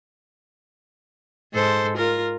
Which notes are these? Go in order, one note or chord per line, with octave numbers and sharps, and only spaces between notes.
G#2 A4 C5
F4 A#4